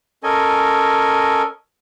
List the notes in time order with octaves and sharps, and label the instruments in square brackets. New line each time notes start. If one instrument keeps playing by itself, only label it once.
[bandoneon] C#4 A4 A#4 D#5 G#5